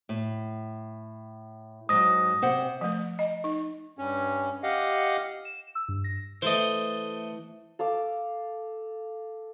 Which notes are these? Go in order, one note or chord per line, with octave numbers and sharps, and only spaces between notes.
A2
G#2 F#3 D#6 A#6
C3 C5 F#5
F3 A3
D#5
D#4
G2 C#4
G4 D#5 F5 F#5
E7
E6
G2
A#6
E3 A3 C5 D#5
A4 F5 D6